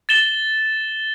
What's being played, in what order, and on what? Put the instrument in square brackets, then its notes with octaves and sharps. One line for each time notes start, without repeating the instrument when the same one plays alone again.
[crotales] A6 E7 G7